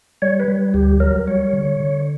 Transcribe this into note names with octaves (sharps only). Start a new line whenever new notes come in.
G3 C#5
B4
G3
D2 G4
F#3 A#4
G3 C#5
D3
D3